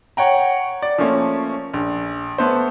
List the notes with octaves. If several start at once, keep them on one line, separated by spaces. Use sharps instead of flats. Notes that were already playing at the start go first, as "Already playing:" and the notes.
C#5 F#5 G5 A#5
D5
F3 A3 A#3 C#4
A#1
A3 B3 A4 C5